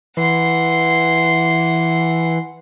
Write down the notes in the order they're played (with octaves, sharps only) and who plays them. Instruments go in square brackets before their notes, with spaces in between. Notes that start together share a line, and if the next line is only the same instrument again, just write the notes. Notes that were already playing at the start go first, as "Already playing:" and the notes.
[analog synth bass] E3 [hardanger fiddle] F#5 C6